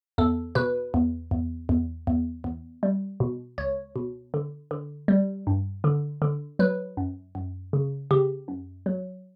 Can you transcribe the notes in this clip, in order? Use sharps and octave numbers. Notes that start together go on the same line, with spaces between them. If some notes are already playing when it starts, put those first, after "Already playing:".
E2 A4
B2 B4
E2
E2
E2
E2
E2
G3
B2
C#2 C#5
B2
D3
D3
G3
G2
D3
D3
F#3 B4
F#2
F#2
C#3
C#3 G4
F#2
F#3